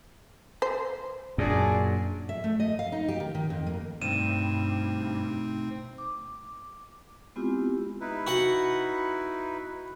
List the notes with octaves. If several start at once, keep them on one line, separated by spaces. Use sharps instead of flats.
C5
F#2 A#2 D4 G#4
E5
A3
D#5
F5
D#4
G4
D#3
D#3
F2
A#3
G2 B2 A3 C4 D#4 D#7 E7
D6
G#3 B3 C4 E4 F4 G4
D#4 E4 B4
F#4 F#5